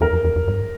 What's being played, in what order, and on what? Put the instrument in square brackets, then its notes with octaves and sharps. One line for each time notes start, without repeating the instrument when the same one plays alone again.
[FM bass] E2 [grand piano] A#4
[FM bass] F2
E2
F2
G2